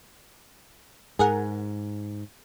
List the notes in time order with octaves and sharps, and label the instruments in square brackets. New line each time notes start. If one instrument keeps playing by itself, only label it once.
[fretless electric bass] G#2 [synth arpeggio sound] G#4 A#4 F#5 [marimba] G#5